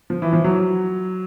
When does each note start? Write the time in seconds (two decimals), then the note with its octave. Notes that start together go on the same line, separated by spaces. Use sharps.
0.10 F3
0.22 E3
0.33 F3
0.44 F#3